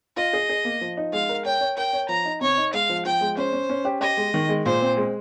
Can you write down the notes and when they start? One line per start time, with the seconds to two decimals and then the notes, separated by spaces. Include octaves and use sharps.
0.16 F4 D#5
0.33 G#4
0.49 G#4
0.65 A#3
0.81 F3
0.97 D#4
1.13 G#3 F5
1.29 A#4
1.45 C#5 G5
1.61 C#5
1.77 A#4 G5
1.93 C#5
2.09 F3 A#5
2.25 D#4
2.41 C3 C#5
2.57 D#4
2.73 G#3 F5
2.90 F3
3.05 F3 G5
3.21 G#3
3.37 C#4 C5
3.53 C#4
3.70 C#4
3.85 G4
4.01 G4 D#5
4.17 G#3
4.34 D#3
4.49 G#3
4.65 A#2 C5
4.82 C4
4.97 G#3